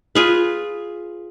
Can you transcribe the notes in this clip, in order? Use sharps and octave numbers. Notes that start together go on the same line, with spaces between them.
F4 G#4 B4